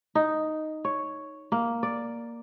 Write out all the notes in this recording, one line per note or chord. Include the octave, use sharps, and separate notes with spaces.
D#4
C#5
A#3
D5